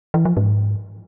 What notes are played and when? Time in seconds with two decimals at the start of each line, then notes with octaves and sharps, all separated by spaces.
0.14 E3
0.25 F3
0.37 G#2